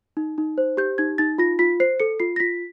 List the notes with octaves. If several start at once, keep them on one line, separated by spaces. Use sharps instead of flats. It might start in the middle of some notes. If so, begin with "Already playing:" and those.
D#4
D#4
C5
G4 G6
D#4 G#6
D#4 A6
F4 A#6
F4 B6
C5 C7
A4 C#7
F4 C7
A#6
F4 B6